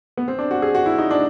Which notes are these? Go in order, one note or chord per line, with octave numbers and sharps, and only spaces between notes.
B3
C4
D4
F#4
G#4
F#4
E4
D#4
D4